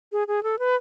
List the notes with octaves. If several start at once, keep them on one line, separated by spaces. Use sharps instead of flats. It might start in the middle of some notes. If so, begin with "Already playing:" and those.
G#4
G#4
A4
B4